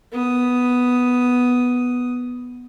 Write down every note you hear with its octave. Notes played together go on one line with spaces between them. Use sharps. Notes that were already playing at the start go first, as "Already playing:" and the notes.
B3 D#6